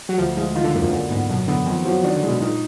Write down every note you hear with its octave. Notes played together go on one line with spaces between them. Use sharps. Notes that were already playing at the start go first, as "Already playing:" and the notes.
F#3
D2 F3
F3 G#3
D#3 F4
D3
F#2 A#3
F2
F#2 D3
G#2 B3
F#2 B2
D3 B3
F2 D#3
F3 F#3
D#3 D4
D3
G#3
B2
A#2 D#4